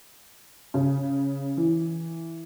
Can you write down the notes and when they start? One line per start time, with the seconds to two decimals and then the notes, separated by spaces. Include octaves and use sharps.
0.74 C#3
1.57 E3